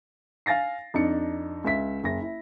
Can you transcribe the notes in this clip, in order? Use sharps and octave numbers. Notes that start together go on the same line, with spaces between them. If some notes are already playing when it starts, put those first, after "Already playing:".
F5 G#5 A6 A#6 C7
F2 D4 D#4 C#7
C#2 E5 B6
F#1 A#6
E4